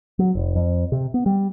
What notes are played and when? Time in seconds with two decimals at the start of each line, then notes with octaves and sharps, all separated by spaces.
0.19 F#3
0.35 F1
0.56 F2
0.92 C3
1.14 B3
1.26 G3